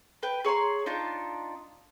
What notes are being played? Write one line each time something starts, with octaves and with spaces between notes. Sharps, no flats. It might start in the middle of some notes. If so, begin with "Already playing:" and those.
B4 G5
G#4 C#5 A#5 C6
D4 D#4 F4 A5